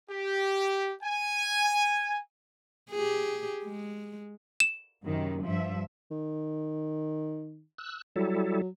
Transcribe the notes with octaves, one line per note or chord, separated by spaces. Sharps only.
G4
G#5
G4 G#4
G#3
E7
F#2 C3 D#3
G2 F3 E5
D#3
E6 F#6
F#3 G3 E4 A4